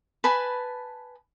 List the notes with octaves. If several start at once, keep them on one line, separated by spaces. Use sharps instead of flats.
B4 G#5 A5 B5